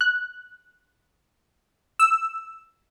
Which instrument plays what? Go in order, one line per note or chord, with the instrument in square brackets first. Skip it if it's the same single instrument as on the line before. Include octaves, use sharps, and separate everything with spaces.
[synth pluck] F#6
[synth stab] E6